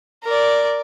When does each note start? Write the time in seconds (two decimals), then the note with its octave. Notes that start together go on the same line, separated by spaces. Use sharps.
0.24 A#4 D5